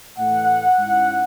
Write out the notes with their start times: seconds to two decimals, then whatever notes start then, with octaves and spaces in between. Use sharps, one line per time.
0.18 A2 E3 A3 F#5
0.78 G#2 G#3 C#4 E4